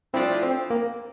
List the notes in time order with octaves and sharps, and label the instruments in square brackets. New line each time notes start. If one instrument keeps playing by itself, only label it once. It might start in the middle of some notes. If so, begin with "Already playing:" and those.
[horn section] F3 A3 D4 F4 [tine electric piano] C4 E4
[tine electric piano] C4
A#3